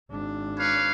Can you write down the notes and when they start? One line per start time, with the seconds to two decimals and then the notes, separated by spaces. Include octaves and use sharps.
0.11 G#1 D4
0.58 B4 C#5 F5